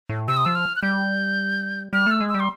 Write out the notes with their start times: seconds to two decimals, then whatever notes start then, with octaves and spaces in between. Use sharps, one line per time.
0.09 A2
0.28 C3 E6
0.37 D#6
0.45 F3 E6
0.55 F6
0.76 F#6
0.82 G3 G6
1.93 G3 F6
2.06 A3 E6
2.21 G#3
2.29 E6
2.34 G3
2.40 C6